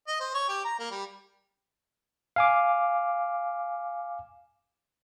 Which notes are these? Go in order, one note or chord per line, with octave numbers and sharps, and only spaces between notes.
D#5
C5
C#5
G4
A#5
A#3
G3
F5 G#5 D6